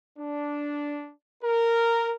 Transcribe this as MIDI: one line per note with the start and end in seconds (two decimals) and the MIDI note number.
0.18 1.12 62
1.44 2.15 70